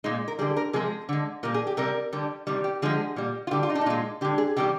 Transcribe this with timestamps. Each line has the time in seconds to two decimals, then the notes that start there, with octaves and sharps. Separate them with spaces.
0.04 A#2 G#3 D#4
0.28 A#4
0.39 D3 G3 G#4
0.56 A#4
0.73 C3 F3 G#3 G#4
1.09 D3 G#3
1.43 A#2 G3 A#4
1.54 G#4
1.67 G4
1.77 C3 G3 A#4
2.13 D3 G3
2.47 C3 D#3 G3
2.64 G4
2.82 D3 F3 G#3 G#4
3.16 A#2 G3
3.47 F4
3.51 D3 G3 G4
3.63 F4
3.70 D#4
3.75 D4
3.81 D#4
3.86 A#2 G#3 F4
4.21 D3 G4
4.25 G#3
4.38 G#4
4.56 C3 D#3 G3 G4